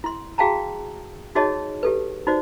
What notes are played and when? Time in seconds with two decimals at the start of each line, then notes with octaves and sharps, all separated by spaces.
0.04 E4 C6
0.38 F#4 G#4 F5 G5 A5 A#5
1.35 D#4 F#4 G#4 C#5 D#5 A5
1.83 G4 A4 B4
2.27 D#4 F#4 C5 D5